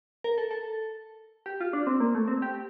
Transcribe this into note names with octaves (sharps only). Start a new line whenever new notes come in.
A#4
A4
A4
G4
F4
D4
C4
A#3
A3
C4
G4